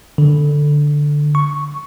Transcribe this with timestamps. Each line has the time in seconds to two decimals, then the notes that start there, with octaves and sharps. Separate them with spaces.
0.18 D3
1.35 C#6